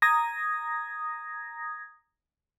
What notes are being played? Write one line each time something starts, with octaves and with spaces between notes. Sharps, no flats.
A#5 D#6 G#6 A#6